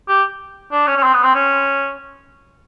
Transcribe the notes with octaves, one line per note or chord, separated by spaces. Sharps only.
G4
D4
C#4
C#4
C4
B3
C4
C#4